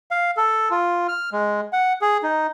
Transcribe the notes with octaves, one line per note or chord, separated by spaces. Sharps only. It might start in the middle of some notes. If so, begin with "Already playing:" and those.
F5
A4
F4
F6
G#3
F#5
G#4
D#4